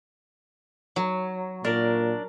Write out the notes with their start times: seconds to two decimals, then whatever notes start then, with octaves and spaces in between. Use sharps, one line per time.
0.96 F#3
1.65 A#2 D4 A#4